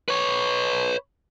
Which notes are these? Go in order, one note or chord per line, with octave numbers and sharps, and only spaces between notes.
B4 C#5